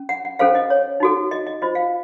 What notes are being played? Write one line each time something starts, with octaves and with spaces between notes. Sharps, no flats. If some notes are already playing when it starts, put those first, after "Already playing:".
Already playing: C#4
F#5
F#5
C#4 A4 C5 F5
D#5
C#5
D#4 F#4 A4
D#5
D#5
F4 C5 D#5
F5